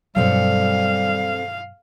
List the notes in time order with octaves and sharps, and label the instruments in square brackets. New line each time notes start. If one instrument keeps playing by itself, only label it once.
[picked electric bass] G2 B2 F#3 [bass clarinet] G3 [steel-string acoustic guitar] C4 A4 [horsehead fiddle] F5